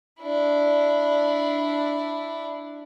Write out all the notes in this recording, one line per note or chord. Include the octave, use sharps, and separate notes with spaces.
D4 E4